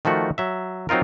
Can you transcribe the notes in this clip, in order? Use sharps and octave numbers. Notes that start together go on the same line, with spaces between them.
D#3 F3 A3 F#4
F#3 E5
F#3 C4 D#4 F4 A#4